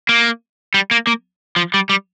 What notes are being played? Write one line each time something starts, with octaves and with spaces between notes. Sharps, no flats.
A#3
G3
A#3
A#3
F3
G3
G3